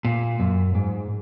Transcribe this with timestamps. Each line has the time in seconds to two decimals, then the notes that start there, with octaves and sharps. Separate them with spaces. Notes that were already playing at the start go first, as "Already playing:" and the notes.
0.05 A#2
0.40 F#2
0.75 G#2